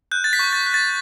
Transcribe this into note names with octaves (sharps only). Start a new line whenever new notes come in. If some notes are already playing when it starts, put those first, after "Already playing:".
F#6 G6
A6
B6
C#6
A6
F#6
A6